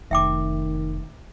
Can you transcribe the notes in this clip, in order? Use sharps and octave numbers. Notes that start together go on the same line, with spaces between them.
F1 D#3 E5 G5 D6